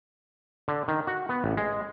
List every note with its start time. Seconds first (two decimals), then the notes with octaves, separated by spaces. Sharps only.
0.68 D3
0.88 D#3
1.07 F#4
1.29 B3
1.44 A1
1.57 G#3